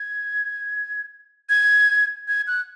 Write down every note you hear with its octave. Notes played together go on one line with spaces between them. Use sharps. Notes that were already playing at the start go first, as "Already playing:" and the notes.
Already playing: G#6
G#6
G#6
F#6